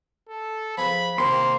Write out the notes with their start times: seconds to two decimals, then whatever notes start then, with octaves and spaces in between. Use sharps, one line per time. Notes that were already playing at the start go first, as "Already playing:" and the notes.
0.29 A4
0.78 F3 G#4 B4 B5
1.18 C3 D#3 A#3 C4 C6